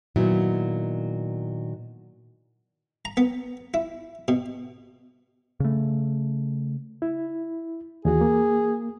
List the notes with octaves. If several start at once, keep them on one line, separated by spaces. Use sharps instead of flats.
A#2 D#3 F#3 B3 E4
A#5
B3
E4
B2
C#3 A3
E4
D#2 E3 F#4 G#4
A#3